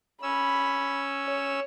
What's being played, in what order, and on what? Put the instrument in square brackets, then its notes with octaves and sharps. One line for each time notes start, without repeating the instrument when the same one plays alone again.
[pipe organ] C#4 E6 [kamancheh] B5
[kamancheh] C#5